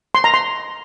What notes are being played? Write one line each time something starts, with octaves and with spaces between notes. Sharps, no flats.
C6
A#5
C6